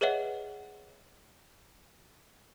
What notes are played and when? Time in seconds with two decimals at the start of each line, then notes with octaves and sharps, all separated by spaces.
0.01 G#4 B4 C#5 D#5 E5 F#5